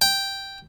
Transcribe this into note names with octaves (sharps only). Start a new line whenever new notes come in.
G5